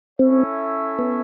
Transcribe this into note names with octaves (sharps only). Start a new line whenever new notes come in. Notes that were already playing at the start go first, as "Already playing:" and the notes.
C4 C#4 E4 A4 C#5 E5
B3